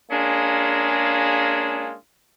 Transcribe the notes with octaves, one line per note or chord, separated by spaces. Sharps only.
G#3 A#3 C#4 D4 F4 G#4